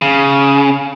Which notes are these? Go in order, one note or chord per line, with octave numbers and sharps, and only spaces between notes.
C#3